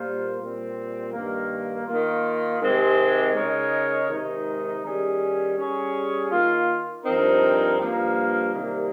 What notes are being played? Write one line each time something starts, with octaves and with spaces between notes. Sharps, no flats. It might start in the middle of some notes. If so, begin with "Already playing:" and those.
Already playing: A#2 G3 A#3 F4 C5
A#2 G3 C4
G2 D#3 A#3
D#3 A#3 F4
C3 D#3 G#3 C4 G4
C#3 G#3 D#4 A#4 C#5
C3 D#3 G#3 D#4
D#3 G3 C#4 G#4
G3 C#4 G#4 C#5
D#3 A#3 F4
G2 F3 C4 D#4 A#4
G2 F3 A#3
C3 D#3 G3 A#3